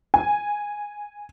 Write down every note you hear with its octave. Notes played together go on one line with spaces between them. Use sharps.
G#5